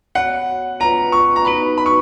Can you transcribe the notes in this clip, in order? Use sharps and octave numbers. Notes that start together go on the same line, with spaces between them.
B3 F#4 C#5 F#5
B3 F4 B4 A#5
C#6
A#5
B3 D#4 F#4 B4 B5
B5
C#6